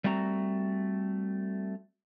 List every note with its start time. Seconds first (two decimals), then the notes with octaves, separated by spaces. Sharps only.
0.04 G3 A3 C4 F#4 A#5